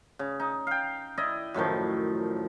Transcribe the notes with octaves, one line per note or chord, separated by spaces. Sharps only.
C#3
D#4
F5 G5
E4 D5 D#5
F#2 A2 D#3 F3